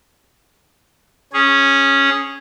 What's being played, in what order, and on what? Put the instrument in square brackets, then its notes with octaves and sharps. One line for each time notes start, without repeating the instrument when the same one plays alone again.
[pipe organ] C#4 G#4